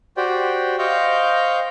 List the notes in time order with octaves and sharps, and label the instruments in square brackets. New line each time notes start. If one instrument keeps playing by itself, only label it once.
[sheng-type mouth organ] F#4 G4 C5 D5 G5
C5 D#5 F5 G5 C#6 G6